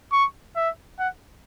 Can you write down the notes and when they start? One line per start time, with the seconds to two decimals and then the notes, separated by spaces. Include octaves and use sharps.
0.12 C#6
0.56 E5
0.99 F#5